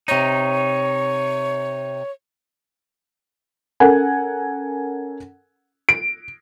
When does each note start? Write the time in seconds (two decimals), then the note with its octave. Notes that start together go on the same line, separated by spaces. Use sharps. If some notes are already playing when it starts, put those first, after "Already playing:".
0.08 C3 D#4 C#5
3.80 C#4 A4 A#4 F#5 G#5
5.89 D7